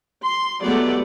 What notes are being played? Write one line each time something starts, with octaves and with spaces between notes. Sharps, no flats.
C6
F#3 G#3 A3 B3 G4 D5